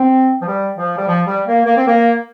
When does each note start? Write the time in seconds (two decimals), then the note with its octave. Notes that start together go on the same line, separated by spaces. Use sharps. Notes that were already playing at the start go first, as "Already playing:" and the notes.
Already playing: C4
0.41 F3
0.47 G3
0.77 F3
0.97 G3
1.06 F3
1.26 G3
1.46 A#3
1.65 A#3
1.76 C4
1.86 A#3